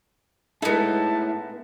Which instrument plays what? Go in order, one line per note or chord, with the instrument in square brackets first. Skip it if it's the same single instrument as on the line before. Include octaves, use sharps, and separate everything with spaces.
[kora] G#3 A4 [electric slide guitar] A3 E4 [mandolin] B3 D#4 [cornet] A5